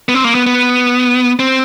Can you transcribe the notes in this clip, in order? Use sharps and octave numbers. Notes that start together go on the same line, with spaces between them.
B3
C4
A#3
B3
B3
C4